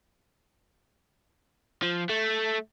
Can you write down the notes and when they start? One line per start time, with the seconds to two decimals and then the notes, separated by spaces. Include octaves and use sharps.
1.83 F3
2.10 A3